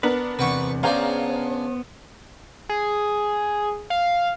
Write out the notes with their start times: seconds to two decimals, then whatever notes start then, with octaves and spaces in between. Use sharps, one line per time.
0.03 B3 D4 A#4 B4
0.39 E2 C3 B4 F#5 C#6
0.83 C#3 B3 D4 G#4 C5 F5 A#5
2.69 G#4
3.90 F5